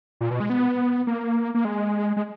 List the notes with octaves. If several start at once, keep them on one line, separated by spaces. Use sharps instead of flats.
A#2
B2
G#3
B3
A#3
A#3
G#3
G#3